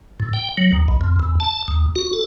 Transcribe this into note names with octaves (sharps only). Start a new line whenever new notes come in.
A2
G5
F#3
D#2
B1
F2
E2
A5
D#2
F#4
A4